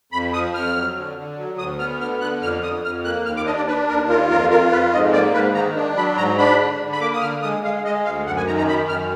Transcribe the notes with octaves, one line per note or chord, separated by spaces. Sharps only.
F2 B5
F3 D#6
F2 F6
F#3
D3
D3
F#3
D2 D#6
B3 F6
D3 F6
D3 F#6
F2 F6
F2 D#6
F2 F6
A#3 F#6
D#2 F6
D6
D4 D#5
D5
D4 B4
D#2 A#4
F4 A#4
F2 A#4
F4 A#4
F2 B4
G#2 D#5
A#3 D5
G#2 B4
D#3 A#5
D4
F#3 B5
G#2 A#5
D4 B5
D3
D3
B5
A#3 D6
D#6
D3 F6
G#3 D#6
G#3 F5
G#3 D#5
D2 F5
F#2 F#5
G#5
D#3 A#5
A#5
F#2 B5
F#2 F6